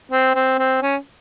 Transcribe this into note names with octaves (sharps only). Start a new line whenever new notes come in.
C4
C4
C4
C#4